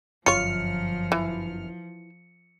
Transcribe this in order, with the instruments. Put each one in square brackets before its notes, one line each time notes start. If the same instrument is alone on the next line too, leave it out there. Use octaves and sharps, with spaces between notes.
[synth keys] G1 F#2 F6 [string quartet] F3 [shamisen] F4 C#5 [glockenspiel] C#7
[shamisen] E3